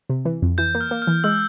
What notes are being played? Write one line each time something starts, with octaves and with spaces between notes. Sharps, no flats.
C3
E3
F2
E3 G6
A#3
F6
A#3
F6
E3
G#3 E6